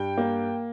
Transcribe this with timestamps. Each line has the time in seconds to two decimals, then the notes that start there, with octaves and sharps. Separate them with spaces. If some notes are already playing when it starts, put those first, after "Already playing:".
Already playing: G2 G5
0.18 A#3